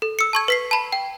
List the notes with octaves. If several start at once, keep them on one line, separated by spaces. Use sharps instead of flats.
A4
E6 C#7
A5 C#6 G#6
B4 B6 C7
A5 B5
G5